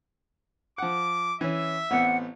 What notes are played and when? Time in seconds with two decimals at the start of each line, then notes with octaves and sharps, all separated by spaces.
0.78 F3 F#5 D6
1.41 E3 C#4 E5
1.91 A1 B3 C4 F#5